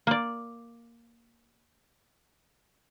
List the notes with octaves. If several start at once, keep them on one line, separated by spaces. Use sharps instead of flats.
A#3 D5